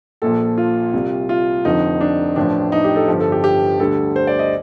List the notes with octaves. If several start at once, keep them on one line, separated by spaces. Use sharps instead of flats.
A#1 A#2 F3 A4
F4
C2 C3 G3
F4
F1 F2 D3 F3 D#4
D4
A1 A2 F3 D4
D#4
G4
A4
G1 G2 F3
A4
G4
G4
D2 D3 G3 A4
C5
D5
D#5